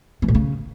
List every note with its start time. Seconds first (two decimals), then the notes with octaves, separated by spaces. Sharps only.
0.22 E3
0.28 A2
0.35 C#3